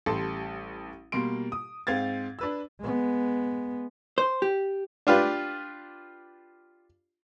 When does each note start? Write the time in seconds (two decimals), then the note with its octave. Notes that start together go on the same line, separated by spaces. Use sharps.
0.06 A1 G3 A4 A5 C6
1.12 B2 G3 A#3 C6 D7
1.52 D#6
1.87 G#2 C4 F5 G#6 A6
2.39 D4 B4 E6
2.80 G#3 B3
4.18 C5
4.42 G4
5.07 D4 F4 G4 B4